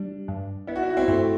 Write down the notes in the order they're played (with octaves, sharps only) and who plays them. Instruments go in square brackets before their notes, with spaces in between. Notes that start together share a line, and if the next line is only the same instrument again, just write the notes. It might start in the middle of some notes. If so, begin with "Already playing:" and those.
Already playing: [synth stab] G3 [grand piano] D4
[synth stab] G2
[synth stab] B3 [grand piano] E4
[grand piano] F#4
E4
F#4
C4 E4
[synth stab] G2 [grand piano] A3 C4